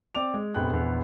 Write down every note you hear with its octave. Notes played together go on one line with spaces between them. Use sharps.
C4 D5 D6 F7
G#3 G#4
F1 A#1 B3 G5 F#6
A#1 E2